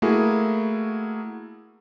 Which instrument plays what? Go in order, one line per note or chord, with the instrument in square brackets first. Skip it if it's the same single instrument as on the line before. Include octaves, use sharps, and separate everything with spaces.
[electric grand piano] A3 A#3 E4 F#4 G#4